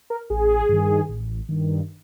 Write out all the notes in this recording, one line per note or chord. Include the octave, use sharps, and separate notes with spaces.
A#4
A1 G#4
G2 D#3
A1
G2 D#3